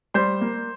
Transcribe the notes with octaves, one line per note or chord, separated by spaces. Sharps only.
G3 C5 C6
A#3